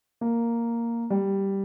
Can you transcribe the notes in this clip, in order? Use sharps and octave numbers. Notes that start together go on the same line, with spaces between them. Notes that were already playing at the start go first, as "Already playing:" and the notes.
A#3
G3